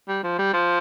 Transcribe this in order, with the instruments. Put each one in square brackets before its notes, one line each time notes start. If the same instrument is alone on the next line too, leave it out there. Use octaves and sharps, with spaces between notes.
[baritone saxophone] G3
F3
G3
F3